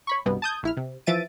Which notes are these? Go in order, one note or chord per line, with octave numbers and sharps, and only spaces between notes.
C#5 B5 C#6
C2 G2 B2 B3
A5 D#6 G6 G#6
A#1 E4 F6
C3
E3 F3 E5 A6 D7 D#7